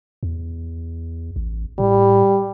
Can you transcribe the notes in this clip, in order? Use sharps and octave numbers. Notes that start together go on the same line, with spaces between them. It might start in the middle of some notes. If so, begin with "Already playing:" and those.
E2
A1
A2 G3